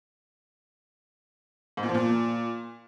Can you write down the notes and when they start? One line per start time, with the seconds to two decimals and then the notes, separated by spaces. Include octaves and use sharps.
1.77 G#2
1.83 A#2
1.89 F3
1.95 A#2